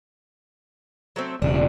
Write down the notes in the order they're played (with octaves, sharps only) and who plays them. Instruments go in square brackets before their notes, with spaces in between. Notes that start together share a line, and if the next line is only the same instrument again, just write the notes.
[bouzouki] F#3 A3 C4
[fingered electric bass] E1 C#3 [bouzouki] D4